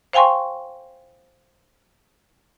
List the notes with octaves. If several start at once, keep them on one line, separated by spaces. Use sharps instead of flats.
C5 F5 G5 G#5 C6 C#6